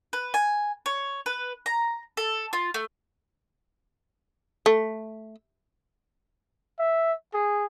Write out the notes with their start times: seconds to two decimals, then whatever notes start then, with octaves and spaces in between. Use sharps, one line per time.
0.13 B4
0.34 G#5
0.86 C#5
1.26 B4
1.66 A#5
2.17 A4
2.53 F4
2.74 A3
4.66 A3
6.79 E5
7.34 G#4